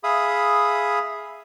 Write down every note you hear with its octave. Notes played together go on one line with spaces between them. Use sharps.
G#4 E5 F5 B5 D#6